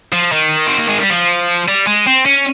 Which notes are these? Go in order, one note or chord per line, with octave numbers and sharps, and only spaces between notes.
F3
D#3
C4
A#3
G#3
G3
F3
G3
G#3
C4
C#4